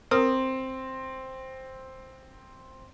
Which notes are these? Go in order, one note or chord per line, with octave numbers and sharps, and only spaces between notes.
C4 A#4 D#6